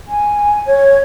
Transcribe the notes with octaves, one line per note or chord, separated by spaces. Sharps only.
G#5
C#5